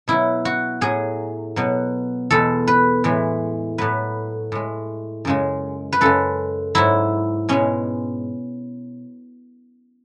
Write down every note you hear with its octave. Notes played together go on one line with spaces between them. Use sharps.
B2 F#3 E4
F#4
A2 F#3 G#4
B2 F#3
E2 B2 G#3 A4
B4
A2 E3 G#3
A2 F#3 B4
A2 G#3
F#2 C#3 G#3
B4
F#2 C#3 G#3 A4
G#2 F#3 E4
B2 G#3 C#4